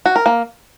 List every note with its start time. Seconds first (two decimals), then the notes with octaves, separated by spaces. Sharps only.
0.06 F#4
0.16 A#4
0.26 A#3